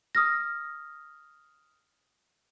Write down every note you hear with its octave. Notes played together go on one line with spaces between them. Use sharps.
D#6 F6 A#6